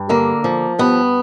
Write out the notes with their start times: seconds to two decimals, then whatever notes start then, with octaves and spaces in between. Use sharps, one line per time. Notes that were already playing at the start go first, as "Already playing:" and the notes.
Already playing: G2
0.09 D3 A#3
0.44 F3
0.79 G2 B3